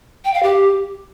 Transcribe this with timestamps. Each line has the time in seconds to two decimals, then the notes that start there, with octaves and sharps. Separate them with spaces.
0.25 G5
0.34 F5
0.43 G4